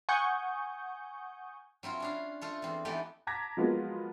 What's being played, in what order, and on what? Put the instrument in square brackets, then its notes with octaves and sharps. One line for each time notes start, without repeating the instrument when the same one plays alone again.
[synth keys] F#5 G#5 C#6 D#6 G6
[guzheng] F#3 C4 E4 F4
C#4 D4 F5
A3 F4 A4
E2 C4
E3 A3 B3 D#4 G4 D5
[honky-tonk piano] A5 A#5 D6 G#6 A#6 B6
F3 F#3 G#3 A#3 B3 F4